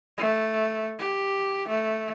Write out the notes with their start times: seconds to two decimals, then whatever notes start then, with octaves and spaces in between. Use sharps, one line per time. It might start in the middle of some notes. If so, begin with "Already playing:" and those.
0.18 A3
0.99 G4
1.69 A3